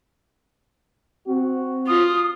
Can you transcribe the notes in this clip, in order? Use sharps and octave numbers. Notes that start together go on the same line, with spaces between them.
C4 F#4
F4 D#6